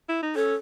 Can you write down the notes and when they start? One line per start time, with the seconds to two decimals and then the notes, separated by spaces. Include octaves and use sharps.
0.09 E4
0.22 D#4
0.35 C#4 A4